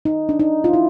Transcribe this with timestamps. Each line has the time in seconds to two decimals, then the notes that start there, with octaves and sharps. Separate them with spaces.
0.05 D#4
0.29 D4
0.39 D#4
0.64 F4
0.73 E4